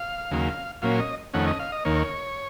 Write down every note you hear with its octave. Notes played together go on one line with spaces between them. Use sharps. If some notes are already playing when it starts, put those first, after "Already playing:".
Already playing: F5
D#2 C#3 F#3 A#3
A#2 F#3 A#3 C#4 F5
D#5
F2 D#3 A3 C#4 F#5
D#5
F5
D#5
D#2 D#3 A#3 C#5